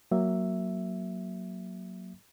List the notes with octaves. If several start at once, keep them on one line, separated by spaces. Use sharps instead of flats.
F#3 A#3 E5